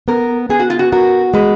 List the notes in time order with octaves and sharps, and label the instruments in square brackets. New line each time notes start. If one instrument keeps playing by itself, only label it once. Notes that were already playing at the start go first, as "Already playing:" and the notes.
[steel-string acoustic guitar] B3 [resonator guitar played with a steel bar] A#4
[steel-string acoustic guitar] B3 [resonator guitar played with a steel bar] G#4
[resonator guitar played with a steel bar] F#4
F4
F#4
[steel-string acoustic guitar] F#4 [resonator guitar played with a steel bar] A#4
[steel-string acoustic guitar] G#3 [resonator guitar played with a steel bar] B4